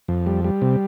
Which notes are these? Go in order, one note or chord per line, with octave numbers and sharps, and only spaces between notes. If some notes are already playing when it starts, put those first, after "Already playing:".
F2
G3
G3
C3